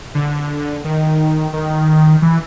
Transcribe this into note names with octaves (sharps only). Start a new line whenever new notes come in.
D3
D#3
D#3
E3